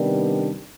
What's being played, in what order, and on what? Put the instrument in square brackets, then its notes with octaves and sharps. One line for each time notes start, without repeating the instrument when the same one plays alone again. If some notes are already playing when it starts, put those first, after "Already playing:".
Already playing: [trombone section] C3 D#3 G3 B3 D4